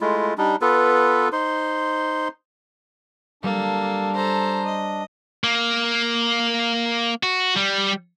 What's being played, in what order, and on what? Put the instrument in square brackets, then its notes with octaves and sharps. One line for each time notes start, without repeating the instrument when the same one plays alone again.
[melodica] G#3 A3 E4 F4
G3 D4 D#4
B3 F4 A4 B4
D#4 C5 C6
[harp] G3 [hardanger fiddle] A#3 [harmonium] D4 [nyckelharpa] A4
[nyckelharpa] A4 A#5 [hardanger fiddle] C5
[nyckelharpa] D#5
[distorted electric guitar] A#3
F#4
G3